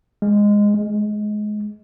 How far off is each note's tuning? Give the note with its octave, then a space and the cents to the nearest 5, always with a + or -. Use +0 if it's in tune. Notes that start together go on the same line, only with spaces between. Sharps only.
G#3 -15
G#3 +20